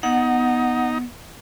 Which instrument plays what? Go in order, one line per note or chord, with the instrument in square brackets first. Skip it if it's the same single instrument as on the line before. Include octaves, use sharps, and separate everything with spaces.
[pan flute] B3 [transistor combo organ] D#4 [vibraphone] F#5